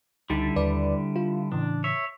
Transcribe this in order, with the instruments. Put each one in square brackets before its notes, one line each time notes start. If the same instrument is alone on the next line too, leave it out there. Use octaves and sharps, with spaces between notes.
[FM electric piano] C#2 D#4 A6 [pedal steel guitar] D3 G3 E4
[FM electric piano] D#2 B4 D5
F4
[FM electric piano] A2 C#3 E3 [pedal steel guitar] D4
[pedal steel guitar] C#5 E5